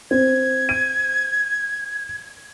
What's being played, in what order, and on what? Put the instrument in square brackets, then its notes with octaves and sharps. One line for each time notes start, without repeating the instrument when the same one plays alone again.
[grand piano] C4 [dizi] G#6
[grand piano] D#7